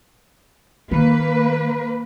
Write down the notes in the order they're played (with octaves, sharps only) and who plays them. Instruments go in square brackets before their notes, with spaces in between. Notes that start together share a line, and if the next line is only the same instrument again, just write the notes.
[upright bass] D#3 [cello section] A#3 B4